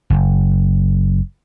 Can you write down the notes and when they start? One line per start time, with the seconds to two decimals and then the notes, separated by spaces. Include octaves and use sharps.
0.10 F#1